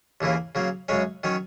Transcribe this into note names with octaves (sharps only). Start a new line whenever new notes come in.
D#2 C#3 E3 A#3
C#3 F#3 A#3
F#2 C#3 G#3 C#4
D#3 F#3 C#4